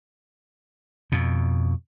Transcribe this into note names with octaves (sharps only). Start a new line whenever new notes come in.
F2 B2